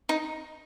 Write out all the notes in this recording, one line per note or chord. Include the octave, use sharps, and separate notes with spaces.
D#4